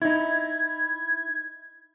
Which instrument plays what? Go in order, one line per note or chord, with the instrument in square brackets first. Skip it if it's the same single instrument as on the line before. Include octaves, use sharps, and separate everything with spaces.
[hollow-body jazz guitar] D#4 E4 [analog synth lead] G#6